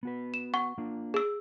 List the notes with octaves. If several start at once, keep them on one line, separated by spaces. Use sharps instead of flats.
B3 F#4 B4
E7
F#5 C#6
A#3 D4 F4
G#4 E6